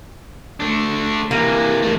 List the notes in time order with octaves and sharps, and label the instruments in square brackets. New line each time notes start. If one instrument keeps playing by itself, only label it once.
[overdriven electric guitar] A3 D4
[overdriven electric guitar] C3 E3 [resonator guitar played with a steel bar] A#3
[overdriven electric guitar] E2 A3